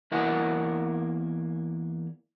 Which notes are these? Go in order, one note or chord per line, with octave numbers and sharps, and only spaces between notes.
E2 A#3 E4 A#4 F#5 G#5